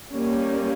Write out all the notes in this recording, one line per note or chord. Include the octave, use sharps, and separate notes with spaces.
G3 A#3 C#4